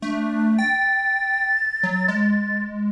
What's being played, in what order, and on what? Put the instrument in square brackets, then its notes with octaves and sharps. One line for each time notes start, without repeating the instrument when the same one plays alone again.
[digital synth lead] A3 [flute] D4
[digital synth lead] G5 [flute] A6
[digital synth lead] F#3
G#3